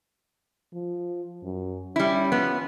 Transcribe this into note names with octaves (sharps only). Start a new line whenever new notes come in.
F3
F#2
G3 C#4 E4
F3 B3